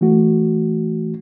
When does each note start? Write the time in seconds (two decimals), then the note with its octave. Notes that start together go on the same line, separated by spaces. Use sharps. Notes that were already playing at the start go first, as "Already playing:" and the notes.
0.01 E3 A3 F#4